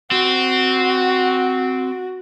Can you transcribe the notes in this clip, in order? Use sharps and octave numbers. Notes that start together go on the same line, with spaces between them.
C4 F#4